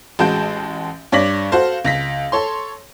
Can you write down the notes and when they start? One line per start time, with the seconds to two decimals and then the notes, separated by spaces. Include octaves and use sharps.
0.19 A1 G#3 F#4 A5 G6 D7
1.12 G2 C#5 D5 A#6 B6 F#7
1.52 F#4 A4 C5 F5
1.85 C#2 A#6 B6
2.32 A4 C#5 C6